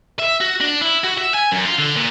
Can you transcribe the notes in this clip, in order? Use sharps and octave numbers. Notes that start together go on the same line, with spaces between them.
E5
F#4
D4
E4
F#4
E5
G#5
F#2
F4
D3
A#2